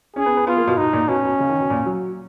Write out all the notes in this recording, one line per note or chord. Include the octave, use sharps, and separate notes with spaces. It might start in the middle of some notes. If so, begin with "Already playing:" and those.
C#4 G#4
B3
B3
B3 F4
A#3
B2
B2 D#4
A#2
B2 C#4
B2
C#3
D#3
B2
A#2
F#3